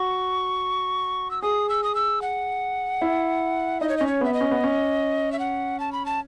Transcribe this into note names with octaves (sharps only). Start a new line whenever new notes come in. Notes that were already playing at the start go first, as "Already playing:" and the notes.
Already playing: F#4 C#6
E6
G#4 D#6
E6
D#6
E6
F#5
E4
D#4 D#5
C#5
C#4 D#5
C#5
B3 E5
D#5
C#4
B3
C#4
E5
F#5
A5
B5
A5